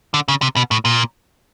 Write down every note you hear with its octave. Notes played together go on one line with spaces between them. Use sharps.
D3
C#3
C3
B2
A2
A#2